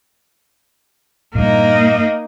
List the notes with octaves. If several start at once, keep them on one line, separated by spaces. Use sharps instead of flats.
G2 A#2 A#3 D#4